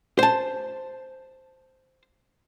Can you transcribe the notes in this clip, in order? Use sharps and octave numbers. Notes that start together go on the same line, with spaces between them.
C5 A5